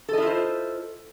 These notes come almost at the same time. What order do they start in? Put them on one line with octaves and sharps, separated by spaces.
A4 D#5 E4 F4 C5